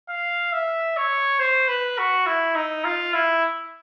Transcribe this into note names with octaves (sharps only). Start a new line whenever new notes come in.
F5
E5
C#5
C5
B4
F#4
E4
D#4
F4
E4